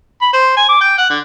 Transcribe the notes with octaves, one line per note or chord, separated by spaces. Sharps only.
B5
C5
G#5
D6
G5
F#5
D3